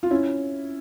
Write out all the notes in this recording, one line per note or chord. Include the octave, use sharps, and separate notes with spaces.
F4
C#4 E4